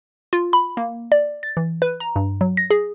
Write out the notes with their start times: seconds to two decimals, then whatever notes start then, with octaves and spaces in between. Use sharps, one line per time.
0.33 F4
0.53 B5
0.77 A#3
1.12 D5
1.43 A6
1.57 E3
1.82 B4
2.00 A#5
2.16 G2
2.41 F#3
2.57 A#6
2.71 G#4